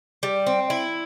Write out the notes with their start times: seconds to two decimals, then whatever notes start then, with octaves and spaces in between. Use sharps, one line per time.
0.23 G3
0.46 C4
0.70 E4